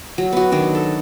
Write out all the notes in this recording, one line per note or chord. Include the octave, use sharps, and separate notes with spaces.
F#3
B3 F#4
D#3 F#3 D4
A4